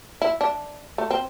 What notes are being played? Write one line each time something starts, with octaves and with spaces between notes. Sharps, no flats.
E4
D4
A3
C4